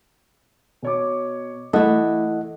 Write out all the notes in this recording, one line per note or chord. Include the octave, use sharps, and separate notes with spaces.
B2 C#5 D6
E3 A3 E4 A4 D#5 F#5